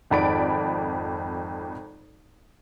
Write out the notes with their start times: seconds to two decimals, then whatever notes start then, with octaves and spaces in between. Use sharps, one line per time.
0.10 G#1 F2 D5 B5 A6 D7